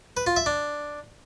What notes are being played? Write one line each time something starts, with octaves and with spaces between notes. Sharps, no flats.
B4
F4
E5
D4